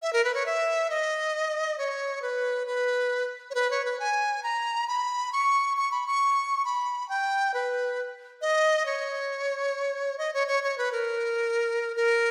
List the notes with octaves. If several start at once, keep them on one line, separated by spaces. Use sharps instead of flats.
E5
A#4
B4
C#5
E5
D#5
C#5
B4
B4
C#5
B4
C#5
B4
G#5
A#5
B5
C#6
C#6
B5
C#6
B5
G5
B4
D#5
C#5
D#5
C#5
C#5
C#5
B4
A#4
A#4